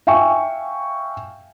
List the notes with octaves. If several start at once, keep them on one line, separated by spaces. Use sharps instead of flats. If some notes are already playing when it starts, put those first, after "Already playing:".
E5 F5 G5 G#5 C#6